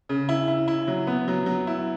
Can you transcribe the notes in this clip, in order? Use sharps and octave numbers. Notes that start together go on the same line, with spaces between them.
C#3
E4
E4
E4
F#3
B3
F#3
F#3
E4